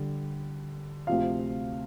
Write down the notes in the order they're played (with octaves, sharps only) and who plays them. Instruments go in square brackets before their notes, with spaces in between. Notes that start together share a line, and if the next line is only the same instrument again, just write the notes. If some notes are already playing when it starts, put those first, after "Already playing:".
Already playing: [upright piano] D3 G3
D2 C3 F3 F5